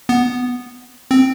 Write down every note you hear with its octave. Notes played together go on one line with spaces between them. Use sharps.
B3
C4